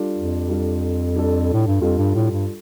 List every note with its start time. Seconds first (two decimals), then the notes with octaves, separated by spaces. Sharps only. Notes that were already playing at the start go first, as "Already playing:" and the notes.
Already playing: G3 D4 F4 A4
0.15 F2
0.48 G3 D4 F4 A4
1.15 G3 D4 F4 A4
1.53 A2
1.67 G2
1.81 F2 G3 D4 F4 A4
1.98 G2
2.15 A2
2.31 G2